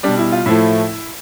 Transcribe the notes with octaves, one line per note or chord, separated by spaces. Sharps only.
B2 G3 D4
E4
F4
A2 F3 A3 E4